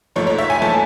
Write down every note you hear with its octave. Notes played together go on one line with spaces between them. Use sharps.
G#2 F3 A3 C#5
C#5
E5
G#5
F3 A3 A5